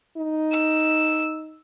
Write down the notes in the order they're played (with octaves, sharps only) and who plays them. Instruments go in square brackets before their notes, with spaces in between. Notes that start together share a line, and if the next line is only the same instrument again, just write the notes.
[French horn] D#4
[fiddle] E6